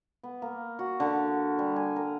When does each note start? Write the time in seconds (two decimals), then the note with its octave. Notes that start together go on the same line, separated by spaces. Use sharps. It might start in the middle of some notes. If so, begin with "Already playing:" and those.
0.23 B3
0.42 A#3
0.79 F#4
1.00 D3
1.59 G3
1.76 G#5
1.96 A#4